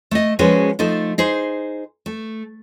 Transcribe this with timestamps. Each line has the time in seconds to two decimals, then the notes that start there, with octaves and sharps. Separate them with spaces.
0.11 A3 D#5
0.39 F3 G#3 C#4 F#4 G#4 B4
0.79 F3 A3 D#4 A4
1.18 D#4 G#4 C5
2.06 A3